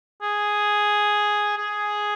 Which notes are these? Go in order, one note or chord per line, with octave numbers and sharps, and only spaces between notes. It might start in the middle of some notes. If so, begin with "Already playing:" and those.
G#4
G#4